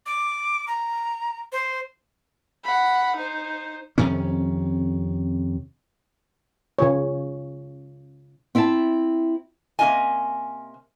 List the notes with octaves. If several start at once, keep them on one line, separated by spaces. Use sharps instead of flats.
D6
A#5
C5
F#5 B5
D#4 C5
F2 C3 D#3 C#4
C#3 F4 C#5
C4 E4 E5 G5 A5
C3 A#3 C#4 F4 D#5 G#5